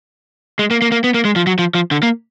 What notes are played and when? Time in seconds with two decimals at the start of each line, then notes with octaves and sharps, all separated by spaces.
0.59 G#3
0.71 A#3
0.82 A#3
0.92 A#3
1.04 B3
1.14 A#3
1.25 G#3
1.36 F3
1.47 F#3
1.59 F3
1.75 F3
1.91 D3
2.03 A#3